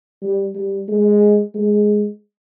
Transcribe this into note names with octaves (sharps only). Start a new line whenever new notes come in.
G3
G3
G#3
G#3